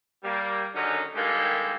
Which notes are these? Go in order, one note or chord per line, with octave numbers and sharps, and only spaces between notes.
G3 A#3
F#2 D3 D#3 C#4 D#4
G2 D#3 G#3 A#3 G4 A4